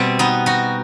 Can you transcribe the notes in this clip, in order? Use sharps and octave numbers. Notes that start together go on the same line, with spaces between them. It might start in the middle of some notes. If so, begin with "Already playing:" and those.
Already playing: B2 G3 C4
B3 D#4
D#4 F#4